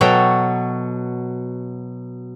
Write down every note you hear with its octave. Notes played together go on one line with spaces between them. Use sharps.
B2 F#3 A4 E5 G5 A#5